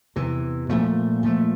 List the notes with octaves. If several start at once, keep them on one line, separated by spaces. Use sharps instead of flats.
E2 C3 E3
A#2 F3 A3
A#2 F3 A3